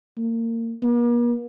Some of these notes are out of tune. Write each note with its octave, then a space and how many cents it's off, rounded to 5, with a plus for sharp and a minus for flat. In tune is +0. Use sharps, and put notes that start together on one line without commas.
A#3 -30
A#3 +45